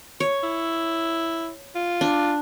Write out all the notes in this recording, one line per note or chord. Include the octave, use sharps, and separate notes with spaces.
C#5
E4
F4
D4